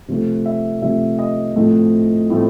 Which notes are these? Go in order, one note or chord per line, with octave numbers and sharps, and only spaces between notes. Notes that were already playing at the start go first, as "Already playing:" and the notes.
C3 F3 A3 C4
E5
C3 F3 A3 C4 E5
D#5
A2 F3 A3 C4
A2 F3 A3 C4